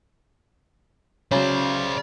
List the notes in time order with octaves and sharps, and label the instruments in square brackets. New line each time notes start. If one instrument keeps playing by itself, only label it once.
[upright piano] C#3 F#3 [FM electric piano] C#4 [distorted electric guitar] C5 D5